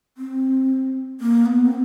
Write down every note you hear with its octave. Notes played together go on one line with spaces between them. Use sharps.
C4
A#3
B3
C4